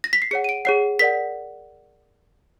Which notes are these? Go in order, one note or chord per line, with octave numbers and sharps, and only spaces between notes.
A#6
B6
C7
G#4 C#5 F#5 C#7
D#7
D7
G#4 C#5 F#5 C7
A#4 D5 F#5 B6